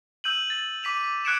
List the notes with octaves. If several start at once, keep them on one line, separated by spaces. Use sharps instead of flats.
E6 G6 D#7 F#7
A6
D6 B6 D#7 F7
D6 F#6 G#6 C#7 D7 E7